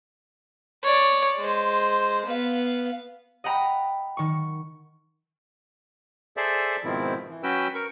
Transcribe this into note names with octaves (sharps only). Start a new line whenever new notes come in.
C#5 D5
G#3 C5
B3 F5
D#5 F#5 G5 A#5 B5
D#3 C#6
G#4 A4 C5 D5 E5
G#2 B2 D#3 F3 C4 E4
E3
F#3 C#4 F#4 B4 G5 E6
A#4 C#6